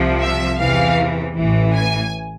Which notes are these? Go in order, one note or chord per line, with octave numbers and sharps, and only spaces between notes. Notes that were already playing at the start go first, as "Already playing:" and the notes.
Already playing: C2 C3 F3
E5
E2 C3 E3 F5
A1 A2 E3
G#5